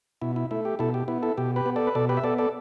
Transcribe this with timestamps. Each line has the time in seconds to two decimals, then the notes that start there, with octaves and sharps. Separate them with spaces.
0.22 B2 E4
0.36 E4
0.51 A3 E4
0.65 G4
0.79 B2 E4 A4
0.94 G4
1.08 B3 E4
1.22 E4 A4
1.37 B2 G4
1.56 G4 B4
1.66 B3
1.76 A4 D5
1.87 B4
1.95 B2 A4 D5
2.09 G4 B4
2.17 E5
2.24 B3 A4 D5
2.38 A4 D5